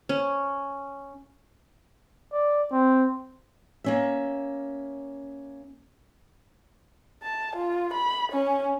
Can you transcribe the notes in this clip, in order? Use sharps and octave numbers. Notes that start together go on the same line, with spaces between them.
C#4
D5
C4
A#3 C#4 E5
A5
F4
B5
C#4